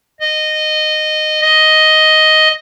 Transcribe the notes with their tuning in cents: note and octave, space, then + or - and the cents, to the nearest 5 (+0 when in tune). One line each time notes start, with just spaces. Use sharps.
D#5 -15
D#5 +5